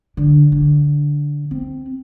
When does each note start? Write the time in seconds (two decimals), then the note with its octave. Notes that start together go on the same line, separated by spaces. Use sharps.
0.17 D3
0.52 D3
1.51 C4